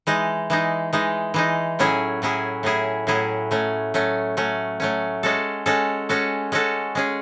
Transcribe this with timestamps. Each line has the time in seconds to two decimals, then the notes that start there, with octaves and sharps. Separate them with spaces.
0.07 E3 G#3 D#4
0.50 E3 G#3 D#4
0.93 E3 G#3 D#4
1.34 E3 G#3 D#4
1.79 A2 F#3 C#4 E4 G#4
2.22 A2 F#3 C#4 E4 G#4
2.63 A2 F#3 C#4 E4 G#4
3.07 A2 F#3 C#4 E4 G#4
3.51 F#3 A3 C#4
3.94 F#3 A3 C#4
4.37 F#3 A3 C#4
4.80 F#3 A3 C#4
5.23 G#3 C#4 F#4 A4
5.66 G#3 C#4 F#4 A4
6.09 G#3 C#4 F#4 A4
6.52 G#3 C#4 F#4 A4
6.95 G#3 C#4 G#4